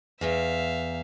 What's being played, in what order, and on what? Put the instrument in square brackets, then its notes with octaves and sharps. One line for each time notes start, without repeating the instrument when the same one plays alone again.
[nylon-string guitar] E2 [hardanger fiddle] E5 F5